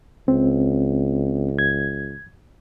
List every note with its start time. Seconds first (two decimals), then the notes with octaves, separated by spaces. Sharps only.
0.28 C#2 C4
1.59 G#6